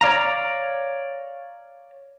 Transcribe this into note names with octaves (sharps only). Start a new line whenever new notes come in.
C#5 D5 F5 A#5